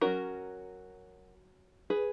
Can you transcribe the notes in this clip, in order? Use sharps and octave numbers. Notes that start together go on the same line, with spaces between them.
F#3 C#4 F#4 A#4
G#4 B4